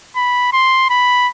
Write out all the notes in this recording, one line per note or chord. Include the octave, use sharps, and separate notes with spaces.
B5
C6
B5